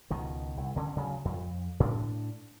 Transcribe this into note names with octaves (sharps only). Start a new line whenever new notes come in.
C#2 B2 D#3
C2
D2 D3 C4 C#4
D2 C#3 F#3
F2
A2 D4